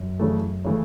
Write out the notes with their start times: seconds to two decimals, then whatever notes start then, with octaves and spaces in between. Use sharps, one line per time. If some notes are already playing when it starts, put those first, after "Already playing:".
Already playing: F#2
0.19 C#3 E3 A3
0.64 C#3 E3 A3